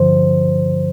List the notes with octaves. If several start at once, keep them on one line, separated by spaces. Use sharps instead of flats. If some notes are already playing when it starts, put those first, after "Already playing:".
Already playing: G2 D3 F3 C5